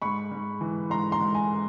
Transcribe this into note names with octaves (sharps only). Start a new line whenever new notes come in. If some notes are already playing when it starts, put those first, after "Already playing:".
G#2 B5 C#6
G#2
E3
G#2 A#5 C6
A#5 C6
G#2
G#5 A#5